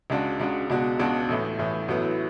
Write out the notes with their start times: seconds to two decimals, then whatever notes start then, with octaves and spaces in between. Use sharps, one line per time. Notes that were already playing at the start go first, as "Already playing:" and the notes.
0.10 C#2 C#3 G#3 D4 F#4
0.40 C#2 C#3 G#3 D4 F#4
0.70 C#2 B2 G#3 D4 F#4
0.99 C#2 B2 G#3 D4 F#4
1.29 A1 A2 E3
1.58 A1 A2 E3
1.88 A1 A2 F#3 B3 E4